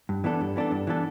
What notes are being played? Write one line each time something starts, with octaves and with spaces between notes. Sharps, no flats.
G2
E3 B3 D4 A4
G2
E3 B3 D4 A4
G2
E3 B3 D4 A4